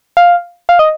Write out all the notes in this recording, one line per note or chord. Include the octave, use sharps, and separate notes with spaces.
F5
F5
D#5